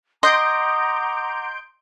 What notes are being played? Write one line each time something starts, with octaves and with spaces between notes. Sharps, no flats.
D#5 F#5 A#5 C6 D6 G6 D7